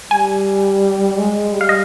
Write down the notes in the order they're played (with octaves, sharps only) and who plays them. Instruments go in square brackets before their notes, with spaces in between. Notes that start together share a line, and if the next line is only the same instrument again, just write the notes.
[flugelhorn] G3 [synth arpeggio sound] G#5
[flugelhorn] G#3
G3
[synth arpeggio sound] F5
D#5